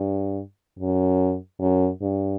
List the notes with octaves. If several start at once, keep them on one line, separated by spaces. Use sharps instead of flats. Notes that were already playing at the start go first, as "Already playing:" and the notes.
Already playing: G2
F#2
F#2
G2